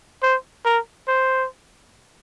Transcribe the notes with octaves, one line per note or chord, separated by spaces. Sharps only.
C5
A#4
C5